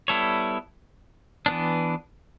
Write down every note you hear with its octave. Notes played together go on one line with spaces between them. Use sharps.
G3 B3 E4 A4 C#5
E3 B3 D4